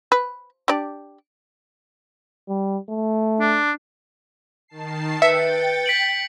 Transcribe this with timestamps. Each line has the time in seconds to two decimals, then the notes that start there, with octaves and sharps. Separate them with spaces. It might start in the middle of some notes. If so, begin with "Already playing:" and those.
0.12 B4
0.68 D4 G4 D5
2.49 G3
2.90 A3
3.40 D4
4.68 D#3 A5 C7
5.22 B4 E5 G5 A6 C#7
5.86 B6 D7 F#7